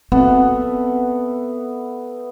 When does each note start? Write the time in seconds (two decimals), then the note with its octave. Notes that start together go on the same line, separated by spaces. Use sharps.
0.12 B3 C4 A4 E5